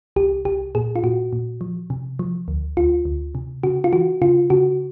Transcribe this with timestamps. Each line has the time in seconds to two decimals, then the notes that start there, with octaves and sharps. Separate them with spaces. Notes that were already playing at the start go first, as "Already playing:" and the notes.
0.16 C2 G4
0.45 C2 G4
0.75 A#2 G#4
0.96 F4
1.03 A#2 F#4
1.33 A#2
1.61 F3
1.90 C3
2.19 F3
2.48 D2
2.77 D2 F4
3.05 D2
3.35 C3
3.63 C#3 F#4
3.84 F4
3.93 E3 F#4
4.22 C#3 F4
4.50 C#3 F#4